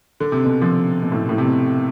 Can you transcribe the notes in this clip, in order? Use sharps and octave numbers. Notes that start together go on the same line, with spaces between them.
D3
C3
B2 D3
D3 F3
B2
A2
A2
C3
B2